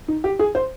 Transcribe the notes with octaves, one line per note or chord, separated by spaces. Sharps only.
D#4
G4
G#4
C5